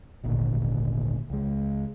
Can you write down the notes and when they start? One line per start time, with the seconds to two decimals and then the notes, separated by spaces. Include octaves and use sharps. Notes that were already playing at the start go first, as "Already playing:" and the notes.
0.24 D#1 G#1 D2 A#2
1.30 C#2 G#3